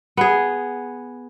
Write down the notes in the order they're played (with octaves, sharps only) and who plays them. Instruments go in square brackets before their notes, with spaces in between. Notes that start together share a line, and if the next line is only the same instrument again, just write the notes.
[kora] B3 G#4